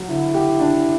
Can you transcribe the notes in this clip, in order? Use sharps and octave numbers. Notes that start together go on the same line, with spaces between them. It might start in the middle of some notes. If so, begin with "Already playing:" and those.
Already playing: F#3
D3 E4
G4
D4